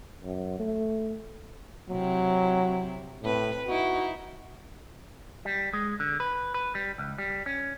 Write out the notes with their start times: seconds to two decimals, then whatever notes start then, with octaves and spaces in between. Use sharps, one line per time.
0.23 F#2
0.59 A3
1.90 C3 F#3 C4 E4
3.23 A2 C4 B4
3.68 D#4 E4 F#4
5.45 G3
5.73 G#3
6.00 D3
6.20 B4
6.54 B4
6.75 G3
6.98 C#2
7.18 G3
7.46 C#4